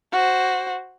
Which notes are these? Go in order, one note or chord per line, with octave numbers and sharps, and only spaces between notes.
F#4 C5